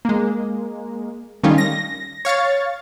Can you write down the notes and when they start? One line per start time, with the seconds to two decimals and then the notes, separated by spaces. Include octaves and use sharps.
0.05 G#3 A#3
1.43 D#3 G3 A3 C#4 D#4 F4
1.58 A#6
2.25 C#5 F5 C#6 A6